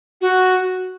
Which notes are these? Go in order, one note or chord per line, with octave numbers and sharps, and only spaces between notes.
F#4